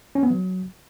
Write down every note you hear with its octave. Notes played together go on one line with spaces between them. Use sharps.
C#4
B3
F#3